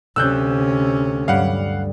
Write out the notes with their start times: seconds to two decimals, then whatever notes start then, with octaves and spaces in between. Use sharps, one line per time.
0.16 D2 C3 C#4 E6 F#6 G6
1.28 G2 G3 F5 F#5